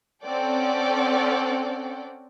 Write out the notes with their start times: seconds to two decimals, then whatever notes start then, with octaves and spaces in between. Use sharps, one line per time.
0.24 C4 C#4 A4 D5 F#5 G5